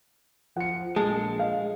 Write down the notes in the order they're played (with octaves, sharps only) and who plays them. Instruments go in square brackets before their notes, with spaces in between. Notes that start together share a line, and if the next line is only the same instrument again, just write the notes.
[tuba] F3 [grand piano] F#5 C#7
[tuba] A#1 [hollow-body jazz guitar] G#3 [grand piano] A5
[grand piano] D#5 F5